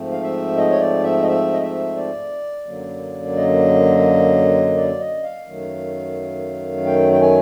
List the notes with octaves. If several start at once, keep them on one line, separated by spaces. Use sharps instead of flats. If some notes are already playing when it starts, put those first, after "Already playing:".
Already playing: G#2 F3 A3 C4
F5
E5
D#5
C#5
D5
E5
D#5
E5
D#5
E5
D5
F#2 D3 F#3 A#3
D#5
D5
D#5
F5
F#2 D#3 F#3 A3
G5
G5
G#5